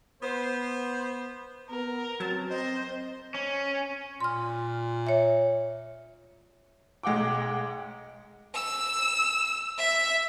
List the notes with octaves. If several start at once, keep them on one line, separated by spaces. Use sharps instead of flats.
B3 C5
B3 A#4
F#3 C4 C#4 A5
C4 C5 D#5
C#4
A#2 C6 F6
C#5 E5
B1 G#3 F#5 G5 D6
E6
E5